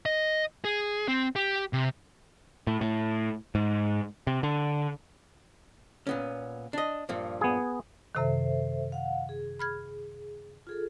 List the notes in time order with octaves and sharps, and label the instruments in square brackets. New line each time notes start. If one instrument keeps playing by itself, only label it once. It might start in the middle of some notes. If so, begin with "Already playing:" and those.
[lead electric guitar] D#5
G#4
C4
G4
C3
[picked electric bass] A2
A2
G#2
C3
D3
[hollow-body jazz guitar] A#2 B3 C#4
D4 D#5
G2 A#2 F3
[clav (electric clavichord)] B3 G#4
[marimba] F#2 C3 D#3 [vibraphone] A4 C5 E5
[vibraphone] F5 F#5
G#4
[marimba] B5 F6 G#6
[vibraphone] F4 G#4 A4